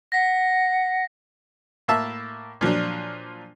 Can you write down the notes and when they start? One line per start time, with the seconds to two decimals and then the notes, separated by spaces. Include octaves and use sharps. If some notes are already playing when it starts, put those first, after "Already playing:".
0.12 F#5 A#6 B6
1.88 A2 A#3 E5 A5
2.61 A#2 F3 F#3 D4